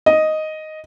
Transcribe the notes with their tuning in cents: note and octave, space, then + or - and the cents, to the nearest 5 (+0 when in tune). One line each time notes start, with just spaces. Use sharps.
D#5 +0